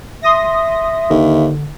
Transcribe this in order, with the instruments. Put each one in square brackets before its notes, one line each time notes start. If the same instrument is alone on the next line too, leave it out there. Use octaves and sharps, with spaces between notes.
[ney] E5 [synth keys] C6 D#6 A#6
[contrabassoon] D#2 [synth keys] D3